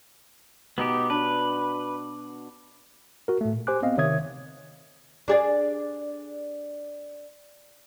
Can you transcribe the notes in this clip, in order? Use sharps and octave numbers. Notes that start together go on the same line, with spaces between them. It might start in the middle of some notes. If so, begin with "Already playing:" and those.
B2 B3 D#4 G4
D4 F#4 B4
F#4 A#4
A2 A3
A#2
G4 C5 G#5 D6 F#6
B3 C4 D#5 F5
C3 D#3 C#5 E5 D#6 G#6
D4 G#4 D5